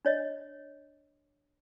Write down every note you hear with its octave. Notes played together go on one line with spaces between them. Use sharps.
D4 C#5 D#5